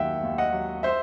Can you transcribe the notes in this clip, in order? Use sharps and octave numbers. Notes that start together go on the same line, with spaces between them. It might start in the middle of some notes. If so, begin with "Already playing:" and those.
Already playing: D#2 D#3 F#3 E5 F#5 G5
D#2
D#5 F#5
F#3
C5 E5